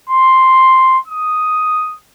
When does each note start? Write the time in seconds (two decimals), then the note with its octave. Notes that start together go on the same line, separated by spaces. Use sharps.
0.09 C6
1.08 D#6